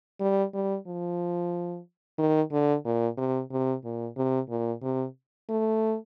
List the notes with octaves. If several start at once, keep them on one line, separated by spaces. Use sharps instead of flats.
G3
G3
F3
D#3
D3
A#2
C3
C3
A#2
C3
A#2
C3
A3